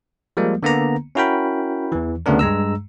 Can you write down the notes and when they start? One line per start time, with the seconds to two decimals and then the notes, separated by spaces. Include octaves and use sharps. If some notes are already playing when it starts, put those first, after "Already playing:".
0.37 F3 G3 G#3 A#3
0.63 D3 A#3 B3 A#5
1.15 C#4 E4 F#4 A#4 G5 B5
1.92 E2 E3
2.26 D2 C#3 A3 B3 D4 A#4
2.39 G2 G#3 A#5 E6